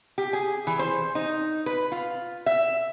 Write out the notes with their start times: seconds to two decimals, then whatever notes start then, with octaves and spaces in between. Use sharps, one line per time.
0.18 G4
0.33 G#4
0.67 E3
0.79 C5
1.15 D#4
1.66 B4
1.92 F4
2.46 E5